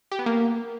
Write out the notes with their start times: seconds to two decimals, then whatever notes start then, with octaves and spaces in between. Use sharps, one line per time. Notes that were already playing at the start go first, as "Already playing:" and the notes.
0.12 G4
0.19 B3
0.26 A#3